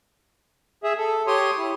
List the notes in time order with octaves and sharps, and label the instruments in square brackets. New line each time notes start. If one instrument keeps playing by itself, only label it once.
[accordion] G#4 E5
A4
G4 C#5 C6 D#6
E4